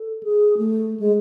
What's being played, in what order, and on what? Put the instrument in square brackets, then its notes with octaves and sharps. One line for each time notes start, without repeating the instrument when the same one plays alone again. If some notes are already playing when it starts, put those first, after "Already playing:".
Already playing: [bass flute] A4
G#4
A3
G#3